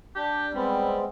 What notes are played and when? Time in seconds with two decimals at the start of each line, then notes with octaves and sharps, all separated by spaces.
0.16 D4 G4
0.54 G3 G#3 B3 C4